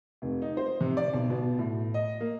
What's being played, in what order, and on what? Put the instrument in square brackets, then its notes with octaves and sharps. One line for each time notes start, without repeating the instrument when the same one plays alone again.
[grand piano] F1
D#4
C5
C3
D5
B1
B2
A2
D#5
A#3